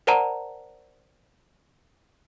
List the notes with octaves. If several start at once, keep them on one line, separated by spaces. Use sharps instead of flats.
A#4 C5 D5 F#5 A5 A#5